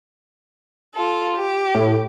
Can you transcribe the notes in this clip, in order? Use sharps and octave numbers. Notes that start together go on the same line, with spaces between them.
F4 A4
G4
A2